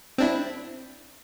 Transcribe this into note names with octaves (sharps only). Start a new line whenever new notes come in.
C4 D4 E4